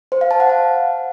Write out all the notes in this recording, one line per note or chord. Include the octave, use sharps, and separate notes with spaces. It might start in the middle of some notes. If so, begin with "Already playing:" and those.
C5
F5
A5
F#5
F5